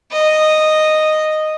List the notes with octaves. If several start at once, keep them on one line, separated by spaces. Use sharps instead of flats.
D#5